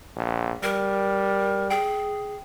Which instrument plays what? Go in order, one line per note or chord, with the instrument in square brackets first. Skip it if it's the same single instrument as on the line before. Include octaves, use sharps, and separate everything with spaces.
[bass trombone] A#1
[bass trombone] G3 [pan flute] A#4
[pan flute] G#4 [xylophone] G5